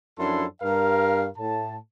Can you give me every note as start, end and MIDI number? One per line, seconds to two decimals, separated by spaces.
0.19 0.45 42
0.19 0.45 53
0.19 0.45 62
0.19 0.45 64
0.19 0.45 69
0.19 0.45 84
0.62 1.27 43
0.62 1.27 70
0.62 1.27 77
1.37 1.76 45
1.37 1.76 81